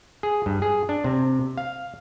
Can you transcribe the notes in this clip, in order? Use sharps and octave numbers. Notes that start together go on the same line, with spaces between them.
G#4
G2
G#4
D4
C3
F5